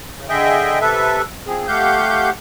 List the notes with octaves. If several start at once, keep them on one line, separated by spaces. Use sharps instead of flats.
C#3
D3 G#4 D#5 E5 G5
C3 A4 B4 E5
F3 C4 G#4
A3 G4 F5 F#5 G6